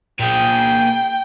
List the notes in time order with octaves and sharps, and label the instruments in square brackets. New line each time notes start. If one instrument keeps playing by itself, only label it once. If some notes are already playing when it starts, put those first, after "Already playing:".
[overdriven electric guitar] A#2 G#4 [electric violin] G5